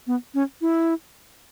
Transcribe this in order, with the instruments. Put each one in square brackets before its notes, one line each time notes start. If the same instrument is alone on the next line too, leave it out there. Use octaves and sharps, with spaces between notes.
[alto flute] B3
C#4
E4